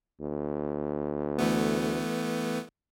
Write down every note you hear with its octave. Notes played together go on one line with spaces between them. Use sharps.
D2
E3 A3 B3